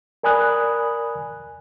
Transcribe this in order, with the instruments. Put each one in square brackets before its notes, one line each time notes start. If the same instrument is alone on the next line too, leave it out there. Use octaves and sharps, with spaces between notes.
[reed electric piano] A#4 D5 G#5 B5 D#6 F#6